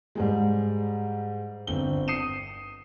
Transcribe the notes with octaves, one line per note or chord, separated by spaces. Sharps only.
G#2 G3 G#3
G1 C4 G7
D#6 C7 C#7 D#7 E7